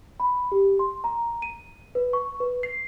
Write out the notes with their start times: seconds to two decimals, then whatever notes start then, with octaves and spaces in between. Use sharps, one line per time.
0.20 B5
0.52 G4
0.79 C6
1.04 A#5
1.42 D#7
1.95 B4
2.13 C#6
2.40 B4
2.63 C7